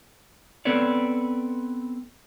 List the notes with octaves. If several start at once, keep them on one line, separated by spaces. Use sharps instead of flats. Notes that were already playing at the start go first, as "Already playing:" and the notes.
B3 C4 A4 B4 C#5 D5